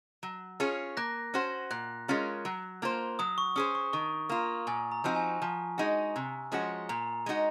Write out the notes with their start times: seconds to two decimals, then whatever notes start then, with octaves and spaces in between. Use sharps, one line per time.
0.23 F#3
0.60 C#4 F4 G#4 C#5
0.97 A#3 F#6 A#6
1.34 C#4 F#4 C5
1.71 A#2 F#6
2.08 G#3 C#4 F4 A#4
2.45 F#3
2.82 A#3 F4 C5
3.19 F#3 D#6
3.38 C#6
3.56 C#4 G#4 C5 D#6
3.75 C#6
3.93 D#3 C#6
4.29 A#3 F4 A#5
4.67 A#2 G#5
4.92 A#5
5.04 F3 C4 D#4 F#4
5.16 G#5
5.42 F3
5.78 G#3 D#4 F#4
6.16 C3
6.52 F3 G#3 C#4 F#4
6.89 A#2 A#5
7.26 G#3 D#4 F#4